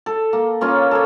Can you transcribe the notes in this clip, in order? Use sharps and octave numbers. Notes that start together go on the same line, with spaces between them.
A4
A#3
A#3 C#4 F4
A4 C#5